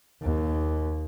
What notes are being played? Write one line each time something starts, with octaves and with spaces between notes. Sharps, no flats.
D#2